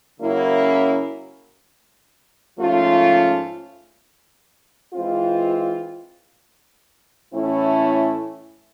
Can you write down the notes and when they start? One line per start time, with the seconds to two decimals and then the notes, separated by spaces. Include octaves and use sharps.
0.19 C#3 F#3 A#3 C#4 E4
2.57 G#2 F3 A3 C#4 F4
4.94 E3 G#3 C4 F4
7.33 A2 E3 A3 C#4 E4